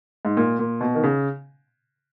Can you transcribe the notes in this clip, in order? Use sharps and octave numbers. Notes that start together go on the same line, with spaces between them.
G#2
A#2
A#2
B2
D#3
C#3